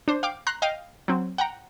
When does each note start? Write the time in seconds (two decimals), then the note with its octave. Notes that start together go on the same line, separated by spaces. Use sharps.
0.08 D4 C5
0.23 F5 G5 D6
0.47 A#5 C6 F#6
0.62 D#5 F5 G5
1.08 F#3 C4
1.38 F#5 G5 A#5